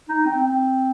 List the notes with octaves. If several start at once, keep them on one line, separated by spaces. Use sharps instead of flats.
D#4
C4
C4